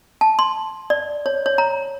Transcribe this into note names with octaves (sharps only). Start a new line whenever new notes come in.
A5
C6
D5
C#5
C#5
A#5